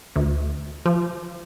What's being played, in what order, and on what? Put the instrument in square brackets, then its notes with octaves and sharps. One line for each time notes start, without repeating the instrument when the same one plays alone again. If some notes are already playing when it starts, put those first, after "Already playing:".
[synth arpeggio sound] D2
F3